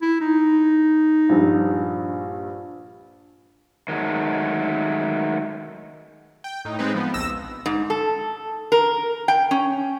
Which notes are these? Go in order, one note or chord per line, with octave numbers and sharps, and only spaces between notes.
E4
D#4
A#1 G2
D#3 F#3 G#3 A3
G5
A2 D#4
G#3 C4 D#4 B4
F3 B3
A#1 D#2 E6 A#6 E7
G#2
A4
A#4
G5
C#4